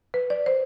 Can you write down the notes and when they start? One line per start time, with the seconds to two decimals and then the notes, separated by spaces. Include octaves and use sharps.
0.14 B4
0.30 D5
0.46 C5